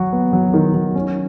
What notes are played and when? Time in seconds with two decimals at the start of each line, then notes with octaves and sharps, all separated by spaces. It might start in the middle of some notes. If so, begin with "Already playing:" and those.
Already playing: F#3 F#4
0.12 B3
0.33 F#3
0.54 D#3
0.74 F#3
0.95 C#4